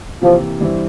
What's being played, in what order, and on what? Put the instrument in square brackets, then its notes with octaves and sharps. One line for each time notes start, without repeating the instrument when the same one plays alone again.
[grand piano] C3 E3 A#3 [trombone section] F3
[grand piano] G2 E3 G3 C4 E4